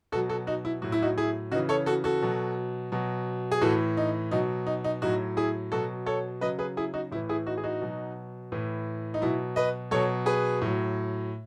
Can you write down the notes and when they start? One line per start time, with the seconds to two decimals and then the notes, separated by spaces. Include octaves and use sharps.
0.12 B2 F#3 F#4 A4
0.29 F#4 A4
0.47 D#4 F#4
0.65 E4
0.82 A2 F#3 F#4
0.92 E4
1.02 D#4 F#4
1.18 E4 G#4
1.51 C#3 D#4 F#4
1.55 E3
1.69 A4 C#5
1.86 F#4 A4
2.04 F#4 A4
2.22 B2 F#3
2.92 B2 F#3
3.52 G#4
3.61 A2 E3 F#4 A4
3.97 D#4
4.31 B2 F#3 D#4
4.67 D#4
4.84 D#4
5.02 A2 F#3 D#4 F#4
5.37 E4 G#4
5.72 B2 F#3 F#4 A4
6.06 A4 C#5
6.41 C#3 F#3 B4 D#5
6.59 G#4 B4
6.77 E4 G#4
6.94 D#4 F#4
7.11 A2 E4
7.15 E3
7.29 E4 G#4
7.46 D#4 F#4
7.57 G#4
7.64 D#4 F#4
7.81 B2 F#3
8.52 A2 E3
9.14 D#4
9.22 B2 F#3 E4
9.56 B4 D#5
9.91 B2 F#3 A4 C#5
10.26 G#4 B4
10.61 A2 F#3